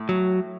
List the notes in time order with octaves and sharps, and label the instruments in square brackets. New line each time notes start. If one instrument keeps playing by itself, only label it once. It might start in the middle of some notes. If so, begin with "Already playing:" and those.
Already playing: [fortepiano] A2
[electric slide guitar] F#3